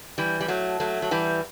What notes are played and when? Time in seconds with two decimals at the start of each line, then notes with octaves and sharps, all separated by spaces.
0.18 E3 G3
0.41 G3
0.48 F#3 A3
0.80 F#3 A3
1.02 F#3
1.11 E3 G3